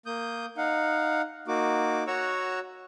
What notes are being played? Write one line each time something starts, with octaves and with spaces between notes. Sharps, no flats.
A#3 D#6 G6
D#4 F5 F#5
A#3 D#4 F#4 D6
F#4 C#5 F#5 A#5 C#6 E6